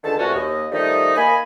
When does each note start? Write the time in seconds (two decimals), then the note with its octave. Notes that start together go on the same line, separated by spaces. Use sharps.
0.03 C#2 D3 D#3 A4 A5
0.19 A#2 F3 G3 A3 C#4 F#4
0.34 D#2 D#5
0.72 D#3 F3 G3 A3 D#4
1.16 A#3 D#5 G#5 B5